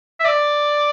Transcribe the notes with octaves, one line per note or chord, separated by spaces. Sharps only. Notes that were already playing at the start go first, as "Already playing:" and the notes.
E5
D5